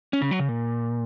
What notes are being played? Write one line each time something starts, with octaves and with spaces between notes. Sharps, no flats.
C#4
C#3
F#3
C#3
A#2